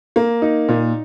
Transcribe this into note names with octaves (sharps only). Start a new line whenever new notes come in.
A#3
D#4
A#2